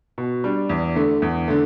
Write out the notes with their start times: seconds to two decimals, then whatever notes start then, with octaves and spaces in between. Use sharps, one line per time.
0.18 B2
0.44 G3 D4
0.69 E2
0.96 D3 A3
1.22 E2
1.48 D3 A3